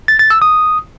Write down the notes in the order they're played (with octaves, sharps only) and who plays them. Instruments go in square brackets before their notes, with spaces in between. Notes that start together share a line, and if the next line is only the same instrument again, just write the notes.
[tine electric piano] A6
A6
E6
D#6